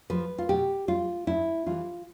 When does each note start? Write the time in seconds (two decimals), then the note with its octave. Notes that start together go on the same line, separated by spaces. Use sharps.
0.10 F3 B4
0.38 F4
0.49 B2 G4
0.88 G3 F4
1.27 G2 E4
1.66 E3 G3 F4